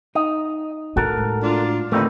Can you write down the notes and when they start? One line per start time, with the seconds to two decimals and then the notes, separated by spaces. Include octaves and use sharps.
0.15 D#4 D#5
0.97 A2 F#4 A4 A#4
1.17 G#2
1.43 D4 F4
1.92 D#2 A#2 D3 A3 A#3 C4 D#4 B4